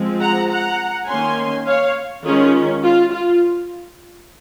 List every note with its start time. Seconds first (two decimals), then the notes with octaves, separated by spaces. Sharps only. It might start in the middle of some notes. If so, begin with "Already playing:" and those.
Already playing: F3 G#3 C4
0.21 F#5 A#5
0.49 F#5 A#5
1.08 D#3 A#3 C#4 G#5 C6
1.66 C#5 F5
2.24 D#3 G#3 C#4 F4 G#4
2.83 F4
3.12 F4